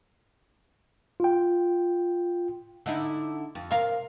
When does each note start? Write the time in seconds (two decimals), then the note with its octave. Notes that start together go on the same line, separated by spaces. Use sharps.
1.20 F4 G5
2.86 D3 D#4 E4
3.55 F2
3.71 C3 A#4 F5